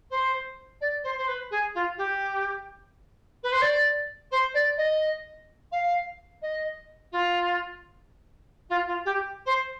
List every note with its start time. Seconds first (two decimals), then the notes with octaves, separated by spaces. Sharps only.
0.10 C5
0.81 D5
1.03 C5
1.17 C5
1.28 B4
1.51 G#4
1.74 F4
1.97 G4
3.43 B4
3.52 C5
3.61 D5
4.31 C5
4.54 D5
4.77 D#5
5.72 F5
6.42 D#5
7.12 F4
8.69 F4
8.87 F4
9.05 G4
9.46 C5